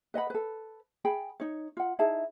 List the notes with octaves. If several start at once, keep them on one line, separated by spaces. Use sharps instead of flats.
B4 D#5 F#5 B5
A4 B4
G#4 G5 B5
D#4 C#5
F4 F#5
D#4 E4 G#4 A5